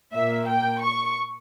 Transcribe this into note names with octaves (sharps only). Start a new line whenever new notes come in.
A#2 A#3 E5
G5
C#6